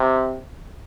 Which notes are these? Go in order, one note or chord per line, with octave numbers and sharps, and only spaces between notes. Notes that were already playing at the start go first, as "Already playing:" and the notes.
Already playing: C3